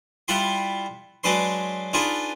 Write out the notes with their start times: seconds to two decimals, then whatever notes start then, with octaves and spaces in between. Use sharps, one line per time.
0.28 G3 E4 F4 F#5 B5 C6
1.24 F#3 G#3 D4 B4 C6
1.93 D4 D#4 F4 G#4 B4